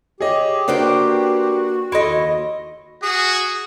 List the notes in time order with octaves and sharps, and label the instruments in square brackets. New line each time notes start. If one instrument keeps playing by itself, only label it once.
[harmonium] G4 [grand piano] G#4 C#5 D#5
[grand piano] A#3 D4 [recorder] F#4 [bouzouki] B4 C5 G5
[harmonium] D#2 [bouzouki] E4 A4 D#5 [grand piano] C6
[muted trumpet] F#4 [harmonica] G#4